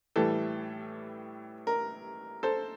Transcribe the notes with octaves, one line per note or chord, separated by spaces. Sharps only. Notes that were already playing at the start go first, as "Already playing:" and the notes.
A2 E3 G3 A4
A#4
A4 C5